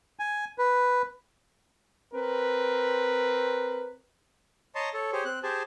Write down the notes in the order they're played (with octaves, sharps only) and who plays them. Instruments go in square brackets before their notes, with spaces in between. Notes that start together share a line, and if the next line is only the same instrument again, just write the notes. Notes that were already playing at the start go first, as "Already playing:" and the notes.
[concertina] G#5
B4
[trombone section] C4 A#4 B4
[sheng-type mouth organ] C#5 D#5 A5 A#5 C6
A4 C#5
G4 G#4 C5 C#5
C4 F#6
G4 G#4 C5 G#5 A5